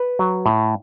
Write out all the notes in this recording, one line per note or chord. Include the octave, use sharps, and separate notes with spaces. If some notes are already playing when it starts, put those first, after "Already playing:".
Already playing: B4
F#3
A2